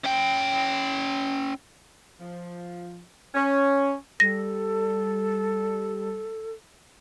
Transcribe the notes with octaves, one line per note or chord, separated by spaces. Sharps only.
C#4 G5
F3
C#4
G3 A4 A#6